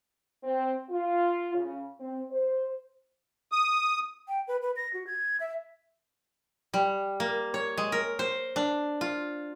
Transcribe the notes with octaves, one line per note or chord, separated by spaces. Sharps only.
C4
F4
C#3
C4
C5
D#6
G5
B4
B4
A#6
F#4
G#6
E5
G3
A#3
C#5
G#3
A#4
C5
D4
F4